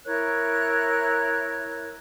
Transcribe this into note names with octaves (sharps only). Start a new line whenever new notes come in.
E4 A#4 C#5 F#6